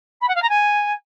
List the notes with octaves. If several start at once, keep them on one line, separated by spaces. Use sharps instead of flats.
B5
F#5
F5
A#5
G#5